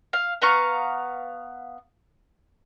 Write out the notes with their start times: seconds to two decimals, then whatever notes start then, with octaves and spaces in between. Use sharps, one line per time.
0.13 F5
0.42 B3 F5 A#5 C#6